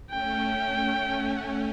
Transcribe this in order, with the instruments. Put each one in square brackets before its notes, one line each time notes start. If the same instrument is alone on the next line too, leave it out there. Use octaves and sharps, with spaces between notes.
[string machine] A3 C#4 [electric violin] G5